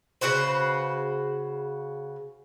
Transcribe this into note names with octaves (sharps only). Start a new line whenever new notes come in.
C#3 F#4 B4 C5